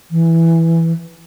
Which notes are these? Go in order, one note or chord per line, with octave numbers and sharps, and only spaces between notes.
E3